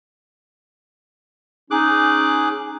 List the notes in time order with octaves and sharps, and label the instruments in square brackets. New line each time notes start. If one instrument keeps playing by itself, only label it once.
[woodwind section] C#4 D#4 [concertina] G#4 D6 F#6